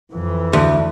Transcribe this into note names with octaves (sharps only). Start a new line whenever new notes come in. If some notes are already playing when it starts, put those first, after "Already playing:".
F2 E3
D2